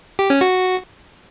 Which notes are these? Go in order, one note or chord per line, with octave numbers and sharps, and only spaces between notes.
G4
C#4
F#4